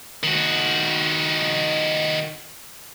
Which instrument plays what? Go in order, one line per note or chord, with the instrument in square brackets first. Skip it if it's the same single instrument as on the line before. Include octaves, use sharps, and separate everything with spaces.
[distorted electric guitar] D#3 F#4